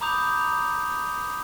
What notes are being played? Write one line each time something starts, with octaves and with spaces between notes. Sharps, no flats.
A#5 B5 D6 D#6 G6 F7